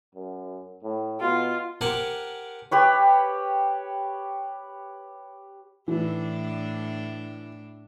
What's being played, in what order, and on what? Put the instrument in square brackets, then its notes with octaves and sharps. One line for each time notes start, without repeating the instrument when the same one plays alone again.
[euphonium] F#2
A2
[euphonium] B2 [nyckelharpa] F4
[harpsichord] G4 A#4 C5 F#5 G#5 A5
[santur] G4 B4 C#5
[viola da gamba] A2 D4 [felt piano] E3